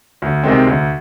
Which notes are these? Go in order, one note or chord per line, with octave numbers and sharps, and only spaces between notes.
D2
C3 D#3 G#3 C4
D2